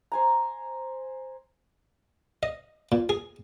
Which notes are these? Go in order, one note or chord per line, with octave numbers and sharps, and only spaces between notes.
C5 G#5 A#5
D#5
A#2
G#4